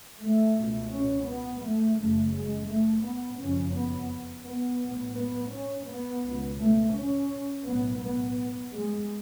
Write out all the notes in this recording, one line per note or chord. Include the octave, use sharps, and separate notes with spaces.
A3
C#2 B2
C#4
B3
A3
F#1 F#2 C#3 A3
G#3
A3
B3
F#1 F2 C#3 C#4
B3
B3
B1 A2
B3
C#4
B3
C#2 B2
A3
C#4
B1 A2 B3
B3
G#3